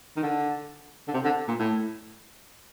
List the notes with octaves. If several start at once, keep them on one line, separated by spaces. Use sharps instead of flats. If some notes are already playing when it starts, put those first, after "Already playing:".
D#3
D3
D3
C3
D3
A#2
A2